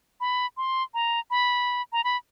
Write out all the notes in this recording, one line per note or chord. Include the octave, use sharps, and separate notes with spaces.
B5
C6
A#5
B5
A#5
B5